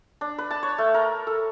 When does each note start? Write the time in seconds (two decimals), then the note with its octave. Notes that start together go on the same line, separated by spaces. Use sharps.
0.21 D4
0.38 B4
0.51 A5
0.63 C#5
0.78 A3
0.94 A#4
1.27 A4